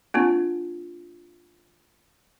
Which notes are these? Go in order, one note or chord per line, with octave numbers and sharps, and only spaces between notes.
A#3 C4 D4 F4